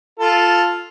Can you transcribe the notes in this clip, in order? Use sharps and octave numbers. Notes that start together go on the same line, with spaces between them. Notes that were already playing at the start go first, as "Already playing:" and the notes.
F4 A4